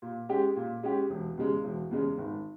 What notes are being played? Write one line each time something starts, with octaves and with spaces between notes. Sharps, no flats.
A#2
G#3 C#4 G4
A#2
G#3 C#4 G4
E1
E2 C#3 G#3
E1
E2 C#3 G#3
G#1